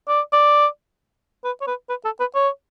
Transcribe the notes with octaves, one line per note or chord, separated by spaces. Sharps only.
D5
D5
B4
C#5
B4
B4
A4
B4
C#5